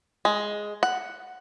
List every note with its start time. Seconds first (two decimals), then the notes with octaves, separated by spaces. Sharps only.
0.25 G#3
0.83 F#5